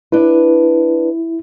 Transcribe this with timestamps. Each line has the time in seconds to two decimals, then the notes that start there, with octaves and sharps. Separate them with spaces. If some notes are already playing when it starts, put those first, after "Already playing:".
0.12 D4 E4 B4